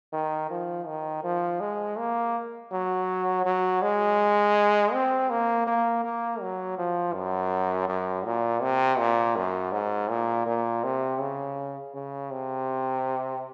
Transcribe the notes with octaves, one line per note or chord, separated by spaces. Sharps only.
D#3
F3
D#3
F3
G#3
A#3
F#3
F#3
G#3
C4
A#3
A#3
A#3
F#3
F3
F#2
F#2
A#2
C3
A#2
F#2
G#2
A#2
A#2
C3
C#3
C#3
C3